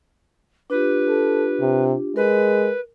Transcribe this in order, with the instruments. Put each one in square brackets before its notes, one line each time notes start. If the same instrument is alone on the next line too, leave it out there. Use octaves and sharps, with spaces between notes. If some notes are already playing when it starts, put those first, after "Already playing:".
[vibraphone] D4 F4 G4 [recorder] B4
[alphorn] A4
C3
[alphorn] G#3 [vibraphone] A#4 [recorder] B4